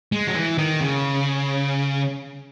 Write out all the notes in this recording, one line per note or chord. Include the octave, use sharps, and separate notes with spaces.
G#3
F#3
E3
D#3
C#3